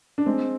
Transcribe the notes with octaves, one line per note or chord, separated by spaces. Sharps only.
D4
G#3 C4